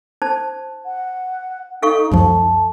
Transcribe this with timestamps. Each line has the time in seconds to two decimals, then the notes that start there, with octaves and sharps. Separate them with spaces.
0.22 D#4 C5 A5
0.85 F#5
1.82 D#4 A4 F5 C#6
2.12 C#2 F#2 F3 A5